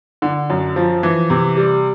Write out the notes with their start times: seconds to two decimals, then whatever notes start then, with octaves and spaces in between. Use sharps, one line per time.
0.22 D3
0.50 F#2
0.76 F3
1.03 E3
1.30 C3
1.57 G3